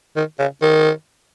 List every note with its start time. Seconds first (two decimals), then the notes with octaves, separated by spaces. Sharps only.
0.16 D#3
0.39 C#3
0.62 D#3